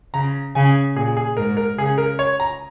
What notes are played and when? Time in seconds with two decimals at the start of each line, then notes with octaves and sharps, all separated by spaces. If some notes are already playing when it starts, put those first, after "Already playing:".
0.14 C#3 A#5
0.55 C#3 G#5
0.96 A#2 G#4
1.17 G#4
1.37 G#2 A#4
1.57 A#4
1.78 C#3 G#4
1.98 A#4
2.19 C#5
2.40 A#5